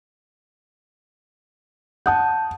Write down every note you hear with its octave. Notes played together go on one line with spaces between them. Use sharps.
F#5 A5 D#6 G6